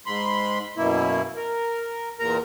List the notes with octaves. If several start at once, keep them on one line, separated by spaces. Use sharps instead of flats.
G#2 B5 C6
F#2 B2 A#3 E4
A#4
E2 A#2 A#4 A#5